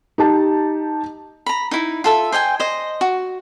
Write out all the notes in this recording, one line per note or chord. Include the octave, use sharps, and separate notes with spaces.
D#4 G4 A5
A#5 B5
D#4 E4
F4 A4 E5
C5 D#5 G5 G#5
C5 D#5
F#4